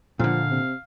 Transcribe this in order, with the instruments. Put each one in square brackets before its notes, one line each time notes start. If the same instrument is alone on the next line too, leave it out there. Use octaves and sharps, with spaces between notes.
[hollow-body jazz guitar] A#2 D3 [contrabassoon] F3 [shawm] F5
[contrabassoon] C3